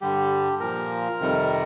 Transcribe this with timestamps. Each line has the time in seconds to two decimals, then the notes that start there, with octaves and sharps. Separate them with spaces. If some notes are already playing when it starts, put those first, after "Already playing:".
0.01 G2 D3 G3 G4
0.60 A#2 F3 A#4
1.20 F2 C3 D#3 G3